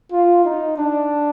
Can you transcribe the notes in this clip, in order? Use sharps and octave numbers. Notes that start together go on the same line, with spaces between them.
F4
D#4
D4